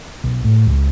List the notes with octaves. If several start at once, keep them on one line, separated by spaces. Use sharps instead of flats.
B1
A2
C#2